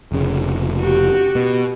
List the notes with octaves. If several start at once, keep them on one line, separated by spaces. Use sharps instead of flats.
F1 C#3
F#4 G4
B2